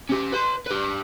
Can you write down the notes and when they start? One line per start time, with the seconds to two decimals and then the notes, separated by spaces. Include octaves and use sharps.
0.09 C#4 G4
0.32 B4 C6
0.66 G4 B4